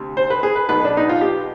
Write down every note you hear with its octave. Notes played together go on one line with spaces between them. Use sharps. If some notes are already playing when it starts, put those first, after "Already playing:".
Already playing: D2 C3
C5
B4
G#4
B4
B1 B2 B4
D4
D#4
F4
G4